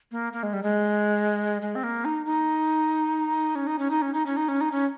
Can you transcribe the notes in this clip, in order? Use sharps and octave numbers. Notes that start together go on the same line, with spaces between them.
A#3
A#3
G#3
G3
G#3
G#3
C4
A#3
D#4
D#4
C#4
D#4
C#4
D#4
C#4
D#4
C#4
D#4
C#4
D#4
C#4